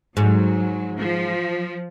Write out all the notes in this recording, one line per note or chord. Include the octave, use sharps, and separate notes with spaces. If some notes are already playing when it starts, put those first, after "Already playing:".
G#2 F#3
F3